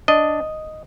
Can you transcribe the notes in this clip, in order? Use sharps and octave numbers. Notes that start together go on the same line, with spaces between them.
D4 D#5